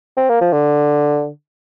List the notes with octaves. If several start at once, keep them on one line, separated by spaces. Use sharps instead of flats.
C4
A#3
F3
D3